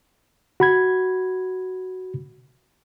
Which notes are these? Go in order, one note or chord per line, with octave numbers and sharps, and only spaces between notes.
F#4 B5 G#6